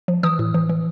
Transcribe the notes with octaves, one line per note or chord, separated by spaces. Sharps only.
F3
E3 D#6
A2
E3
E3